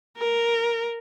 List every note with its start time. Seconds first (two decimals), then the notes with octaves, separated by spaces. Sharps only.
0.18 A#4